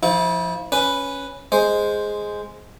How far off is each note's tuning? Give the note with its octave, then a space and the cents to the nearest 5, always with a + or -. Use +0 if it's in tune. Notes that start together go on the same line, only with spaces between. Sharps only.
F3 +0 E4 -35
C#4 +0 B4 +0
G#3 +0 C5 +0